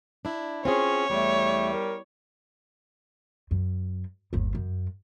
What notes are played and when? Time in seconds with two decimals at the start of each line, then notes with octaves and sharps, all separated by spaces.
0.25 D4 E4
0.65 C4 C#4 F4 G#4 C#5
1.10 E2 G3 A3
1.72 A#4
3.51 F#2
4.33 G1 D#2
4.55 F#2